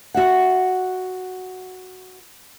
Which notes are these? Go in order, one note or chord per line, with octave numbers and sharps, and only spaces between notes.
F#4 E5 F#5